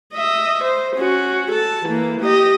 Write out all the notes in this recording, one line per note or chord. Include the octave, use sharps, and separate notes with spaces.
D#5 E5
C5
C#4 F#4
A4 A5
E3 A#3
G4 D#5